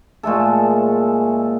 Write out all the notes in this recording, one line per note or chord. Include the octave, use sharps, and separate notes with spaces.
A#2 G#3 A3 A4